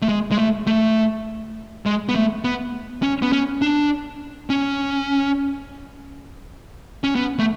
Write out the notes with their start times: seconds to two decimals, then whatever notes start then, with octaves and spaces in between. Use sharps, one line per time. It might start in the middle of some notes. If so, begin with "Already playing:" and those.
0.02 A3
0.09 G#3
0.31 G#3
0.38 A3
0.67 A3
1.86 G#3
2.09 B3
2.15 A3
2.44 B3
3.03 C#4
3.22 B3
3.33 C#4
3.62 D4
4.50 C#4
7.04 C#4
7.15 B3
7.39 A3